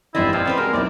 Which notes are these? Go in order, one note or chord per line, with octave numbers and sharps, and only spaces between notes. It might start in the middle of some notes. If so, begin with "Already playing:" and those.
G#1 G2 E3 C4 E4 D5 D#5
A#2 F3 D5 G5
G3 C4 B4
G#3 F#4 A#4
B1 C4 E4 D5